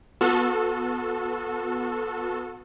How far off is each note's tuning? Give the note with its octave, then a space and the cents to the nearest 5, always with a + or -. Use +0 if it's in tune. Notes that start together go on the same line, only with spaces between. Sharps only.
B3 +5 F#4 -35 A4 +0